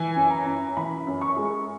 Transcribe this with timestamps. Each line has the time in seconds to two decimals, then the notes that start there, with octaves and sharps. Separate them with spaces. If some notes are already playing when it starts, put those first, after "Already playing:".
Already playing: E3 G#5
0.16 F#2
0.30 A#5
0.46 F#2
0.77 E3 B5
1.07 F#2
1.21 C#6
1.37 G#3